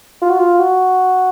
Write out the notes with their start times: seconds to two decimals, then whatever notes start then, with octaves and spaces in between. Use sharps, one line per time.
0.22 F4
0.30 F#4
0.39 F4
0.60 F#4